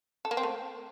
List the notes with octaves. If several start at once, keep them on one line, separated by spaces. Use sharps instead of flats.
A4
A#3
C4
A3